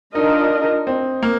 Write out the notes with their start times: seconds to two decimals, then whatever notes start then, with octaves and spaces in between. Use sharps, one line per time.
0.15 D4 D#4 F4 A#4 D#5
0.87 C4
1.22 A#3